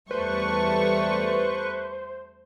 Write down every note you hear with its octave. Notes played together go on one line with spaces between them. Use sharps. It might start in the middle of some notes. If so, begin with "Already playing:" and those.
E2 G3 A3 B4 C5 C#6